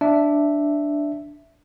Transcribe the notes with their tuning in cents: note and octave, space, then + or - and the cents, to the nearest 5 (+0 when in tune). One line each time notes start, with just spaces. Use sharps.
D4 +0 E5 +0